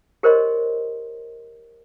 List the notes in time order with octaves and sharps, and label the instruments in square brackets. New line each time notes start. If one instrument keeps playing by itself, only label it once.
[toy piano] G4 A#4 C5 C#5 D#5 C6